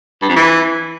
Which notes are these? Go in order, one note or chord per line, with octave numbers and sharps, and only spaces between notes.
G2
F2
E3